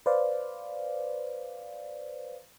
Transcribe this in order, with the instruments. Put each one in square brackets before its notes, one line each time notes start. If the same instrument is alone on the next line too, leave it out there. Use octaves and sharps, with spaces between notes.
[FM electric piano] B4 C5 D5 F5